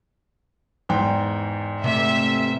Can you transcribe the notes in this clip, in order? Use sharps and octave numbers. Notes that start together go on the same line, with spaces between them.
E2 G#2 G5
C3 E3 A3 E5